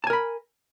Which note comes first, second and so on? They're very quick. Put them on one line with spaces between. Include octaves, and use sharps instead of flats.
A5 G#5 A#4 B5